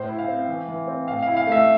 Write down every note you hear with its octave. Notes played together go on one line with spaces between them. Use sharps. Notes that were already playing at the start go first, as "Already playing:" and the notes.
Already playing: A2 C5
E4
F5
C4
E3
E3
C4
A2 F5
E4 F5
F5
A3 E5